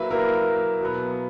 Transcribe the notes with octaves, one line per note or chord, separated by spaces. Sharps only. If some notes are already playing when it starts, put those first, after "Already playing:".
Already playing: F#3 A#3 E4 B4 E5
F#3 A#3 E4 A#4
B2 F#3 B3